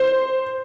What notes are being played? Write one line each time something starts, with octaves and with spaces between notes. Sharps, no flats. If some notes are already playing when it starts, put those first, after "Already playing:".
Already playing: C5